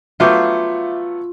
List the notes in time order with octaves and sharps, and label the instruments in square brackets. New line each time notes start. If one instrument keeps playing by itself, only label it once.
[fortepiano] F#3 A3 B3 [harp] F4 [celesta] E5 D6 G6